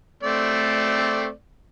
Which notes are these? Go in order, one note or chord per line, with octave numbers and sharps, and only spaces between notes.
A3 C4 D5